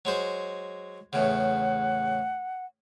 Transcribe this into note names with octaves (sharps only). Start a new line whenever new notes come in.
F#3 G#3 C5
E2 A2 C#3 F#5